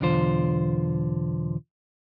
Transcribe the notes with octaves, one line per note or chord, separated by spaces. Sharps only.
B1 E2 D3 F4 C5